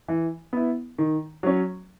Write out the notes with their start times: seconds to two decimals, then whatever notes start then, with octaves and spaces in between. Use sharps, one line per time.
0.08 E3
0.53 B3 E4
0.98 D#3
1.43 F#3 C#4